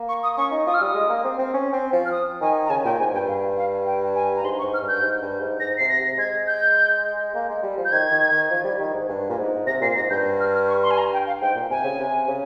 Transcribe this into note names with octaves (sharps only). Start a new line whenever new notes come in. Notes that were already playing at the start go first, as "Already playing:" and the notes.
Already playing: A#3
C#6
D#6
C#4 C#6
D#4
F4 D#6
F6
G3 D#6
G#3
A#3
C4
C4
C#4
C4
F3
F6
D#6
D#3 G#5
A#5
C#3 G#5
A#2 G5
G#2 G#5
G2 G5
F5
F5
G5
G#5
A#5
G#2 C6
C#6
G#2
F6
G2 G6
G#2
G2
G#2
G#2 A#6
C3 C7
A#6
C3
G#3 G#6
G6
A#3
G#3
G3
F3
G6
D#3 G#6
D#3
D#3
F3
G3
D#3
G#2
G2
A#2
G#2
C3 A#6
A#2 C7
G#2 A#6
G2 G6
F6
F6
C#6
C6
G#5
A#5
G5
F5
G#2 G5
A#2
C3 G#5
C#3
C3
C#3